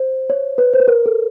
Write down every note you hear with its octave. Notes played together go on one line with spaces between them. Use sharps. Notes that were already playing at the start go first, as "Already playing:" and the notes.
Already playing: C5
C#5
B4
C5
B4
A#4
A4